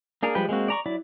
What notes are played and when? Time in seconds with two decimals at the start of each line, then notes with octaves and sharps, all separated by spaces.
0.23 A#3 D4 G#4 A#4
0.35 F3 G3 G#3 B4 G5
0.49 G#3 A#3 C4 F#4
0.68 D5 A#5 C#6
0.86 F#3 E4 D5